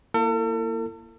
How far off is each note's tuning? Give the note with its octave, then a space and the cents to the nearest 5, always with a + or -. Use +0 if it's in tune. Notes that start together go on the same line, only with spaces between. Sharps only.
A#3 +0 E4 +25 A4 +40